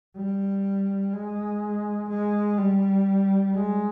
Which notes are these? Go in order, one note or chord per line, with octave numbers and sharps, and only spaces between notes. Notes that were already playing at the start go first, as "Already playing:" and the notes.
G3
G#3
G#3
G3
G#3